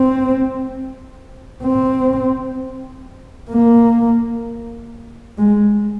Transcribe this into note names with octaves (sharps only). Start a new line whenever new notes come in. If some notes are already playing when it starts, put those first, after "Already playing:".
Already playing: C4
C4
A#3
G#3